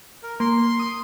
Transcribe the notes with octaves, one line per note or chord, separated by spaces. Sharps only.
A#4
A#3 C6
D#6